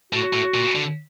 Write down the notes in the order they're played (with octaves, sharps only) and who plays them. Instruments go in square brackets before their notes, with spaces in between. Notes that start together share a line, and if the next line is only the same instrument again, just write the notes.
[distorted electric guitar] A2 [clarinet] F#4
[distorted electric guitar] A2
A#2
D3